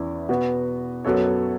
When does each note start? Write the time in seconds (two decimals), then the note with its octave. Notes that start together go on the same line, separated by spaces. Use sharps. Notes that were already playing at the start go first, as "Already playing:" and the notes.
Already playing: E2 E3 C#4 E4
0.29 B2 B3 F#4 B4
1.05 F#2 F#3 B3 A4 C#5